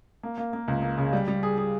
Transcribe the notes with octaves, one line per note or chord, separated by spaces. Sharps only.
A#3
A#3
A#3
C#2
A#3
C#3
G3
G3
G#4
G#4